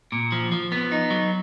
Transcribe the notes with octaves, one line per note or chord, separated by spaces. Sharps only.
A#2
F3
F3
B3
D#4
F#3